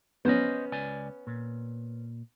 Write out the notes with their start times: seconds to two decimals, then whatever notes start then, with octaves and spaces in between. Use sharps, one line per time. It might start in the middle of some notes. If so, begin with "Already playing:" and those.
0.25 B3 C#4 C5 D#5
0.72 C#2 D5 G#5
1.27 A#2